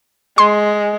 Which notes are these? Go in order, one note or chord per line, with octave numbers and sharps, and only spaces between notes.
G#3 C6